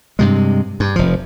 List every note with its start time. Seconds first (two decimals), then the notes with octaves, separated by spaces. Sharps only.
0.19 G2 C3 G#3
0.80 G2
0.96 F1 F3